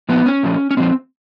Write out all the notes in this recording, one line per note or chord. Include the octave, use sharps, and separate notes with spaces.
A#2 F3 B3
C#4
A#2 F3
C#4
A#2 F3 C4